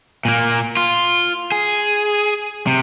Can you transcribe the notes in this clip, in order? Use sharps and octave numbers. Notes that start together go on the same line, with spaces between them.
A#2 A#3
F4
G#4
C3